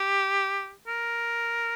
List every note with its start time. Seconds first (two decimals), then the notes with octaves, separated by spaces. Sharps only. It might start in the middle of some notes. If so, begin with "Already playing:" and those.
Already playing: G4
0.88 A#4